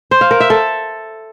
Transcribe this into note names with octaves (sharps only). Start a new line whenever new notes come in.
C5
F5
A#4
E5
A4